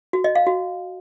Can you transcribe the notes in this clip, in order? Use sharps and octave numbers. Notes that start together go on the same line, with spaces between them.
F#4
D#5
F5
F#4